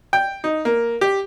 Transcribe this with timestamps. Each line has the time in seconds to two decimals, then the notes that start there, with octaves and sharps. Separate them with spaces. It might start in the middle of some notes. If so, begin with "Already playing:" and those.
0.13 G5
0.44 D#4
0.65 A#3
1.01 G4